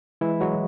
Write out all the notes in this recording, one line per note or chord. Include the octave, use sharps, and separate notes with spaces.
E3 G#3 E4
F#3 G#3 F#4